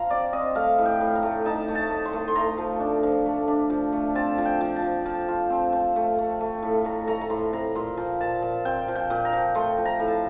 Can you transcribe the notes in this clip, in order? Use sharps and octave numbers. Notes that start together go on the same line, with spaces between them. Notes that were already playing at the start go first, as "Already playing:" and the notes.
Already playing: F3 F4 F5 A#5 C6
C4 D5
C4 D#5
A3 F5
A2
G5
A2
A#5
A3
D#4 A5
A3
A5
A3
C6
A3
C6
A3 A#5
F3
D4
F3
A3
D4
F3
A3
C4 A5
F3
G5
F3
A5
F3
F3
F4
C4
C4
A3
A3
A3
A2
A3 A#5
A3 A#5
A#5
A2 C6
C4 A#5
A#2 C6
F3
A#2 A5
A#2
C4 G5
F3
G5
A#2
A#5
F3
A3 C6
F3
A#5
A2
A5